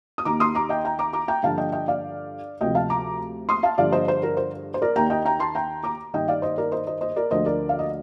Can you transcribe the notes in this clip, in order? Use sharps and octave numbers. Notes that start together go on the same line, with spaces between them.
D#6
D#2 D#3 A#5 D6
C6 D#6
A#5 D6
D#5 G5
G5 A#5
A#5 D6
A#5 D6
G5 A#5
G2 D3 F3 F5 A5
D#5 G5
D#5 G5
D5 F5
D2 C3 F3 D#5 G5
F5 A5
A#5 D6
C6 D#6
F5 A5
G2 D3 F3 D5 F5
C5 D#5
C5
A#4
C5
C5
A#4 D5
D#2 D#3 G5 A#5
D#5 G5
G5 A#5
A5 C6
G5 A#5
A#5 D6
G2 D#3 D#5 G5
D5 F5
C5 D#5
A#4 D5
C5 D#5
C5 D#5
C5 D#5
A#4 D5
D2 D3 F3 C5 D#5
A#4 D5
F5
D#5